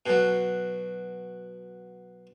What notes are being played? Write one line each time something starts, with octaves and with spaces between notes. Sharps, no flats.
B2 F#3